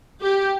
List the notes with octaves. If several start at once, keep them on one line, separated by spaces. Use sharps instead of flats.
G4